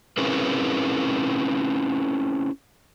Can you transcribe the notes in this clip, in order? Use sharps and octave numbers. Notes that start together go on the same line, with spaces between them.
C4 C#4 E4 G#4 A#4 B4